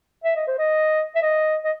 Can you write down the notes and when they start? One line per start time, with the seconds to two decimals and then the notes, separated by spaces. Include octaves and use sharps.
0.24 E5
0.36 D#5
0.47 C5
0.58 D#5
1.15 E5
1.22 D#5
1.64 D#5